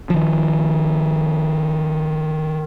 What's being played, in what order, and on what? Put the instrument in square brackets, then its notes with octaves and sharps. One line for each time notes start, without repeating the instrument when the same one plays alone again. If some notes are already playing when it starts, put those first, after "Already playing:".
[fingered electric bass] D#3 F3